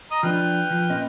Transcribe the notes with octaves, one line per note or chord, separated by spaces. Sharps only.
D#5 A#5
F3 D4 B4 G5 F6
F3
A#2 C#4 D#5